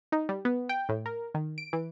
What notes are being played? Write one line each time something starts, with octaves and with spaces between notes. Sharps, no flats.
D#4
G3
B3
G5
A2
A#4
D#3
D7
E3